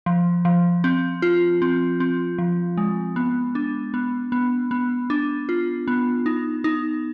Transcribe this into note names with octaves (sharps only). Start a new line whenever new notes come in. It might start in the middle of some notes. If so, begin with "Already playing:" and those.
F3
F3
C4
F4
C4
C4
F3
G#3
B3
D4
B3
B3
B3
D4
F4
B3
D#4
D#4